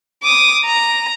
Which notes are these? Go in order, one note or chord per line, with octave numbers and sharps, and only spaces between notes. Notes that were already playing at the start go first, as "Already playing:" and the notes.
D6 D#6
A#5